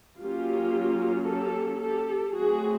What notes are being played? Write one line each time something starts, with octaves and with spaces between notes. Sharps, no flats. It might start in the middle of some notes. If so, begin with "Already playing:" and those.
F#3 A#3 C#4 F4 G4
G4 A4
G4 A4
F#3 A3 C4 F#4 G#4